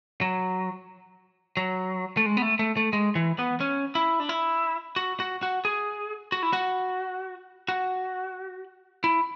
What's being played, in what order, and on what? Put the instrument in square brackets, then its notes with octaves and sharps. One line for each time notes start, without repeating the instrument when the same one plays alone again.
[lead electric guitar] F#3
F#3
A3
G#3
B3
A3
A3
A3
G#3
E3
B3
C#4
E4
D4
E4
F#4
F#4
F#4
G#4
F#4
E4
F#4
F#4
E4